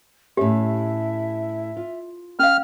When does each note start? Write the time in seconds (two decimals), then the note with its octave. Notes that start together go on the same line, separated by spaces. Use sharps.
0.37 A2 C#4 G4 E5
1.77 F4
2.39 C#4 F5 F6